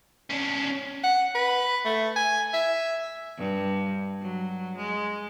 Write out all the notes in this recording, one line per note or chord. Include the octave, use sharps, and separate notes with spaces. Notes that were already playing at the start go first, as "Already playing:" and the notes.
C#4 D4
F#5
B4
A3
G#5
E5
G2
F#3
G#3